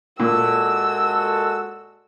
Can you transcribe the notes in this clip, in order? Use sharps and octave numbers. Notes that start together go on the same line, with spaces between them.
A#2 G#3 F#4 A4 E6